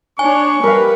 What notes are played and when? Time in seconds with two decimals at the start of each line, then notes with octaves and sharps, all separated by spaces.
0.19 D4 C#5 G#5 C#6
0.63 G3 A#4 B4 F5